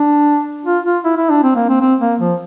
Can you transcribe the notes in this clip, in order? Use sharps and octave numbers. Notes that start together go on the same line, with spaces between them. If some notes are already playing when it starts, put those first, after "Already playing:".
Already playing: D4
F4
F4
E4
E4
D4
C4
A#3
C4
C4
A#3
F3